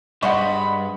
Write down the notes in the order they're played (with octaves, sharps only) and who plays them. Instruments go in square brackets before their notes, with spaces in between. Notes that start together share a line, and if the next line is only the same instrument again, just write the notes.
[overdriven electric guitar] G2 [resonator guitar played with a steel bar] G#3 C5 D#5 [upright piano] F#5 C#6 [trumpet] B5